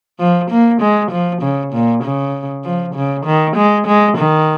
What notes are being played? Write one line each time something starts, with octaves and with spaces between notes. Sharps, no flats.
F3
A#3
G#3
F3
C#3
A#2
C#3
F3
C#3
D#3
G#3
G#3
D#3